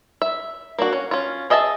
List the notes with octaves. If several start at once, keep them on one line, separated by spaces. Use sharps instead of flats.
E5
A#3 D4 F#4
C#4
C#4 F4
G#4 D#5 E5 G#5 A5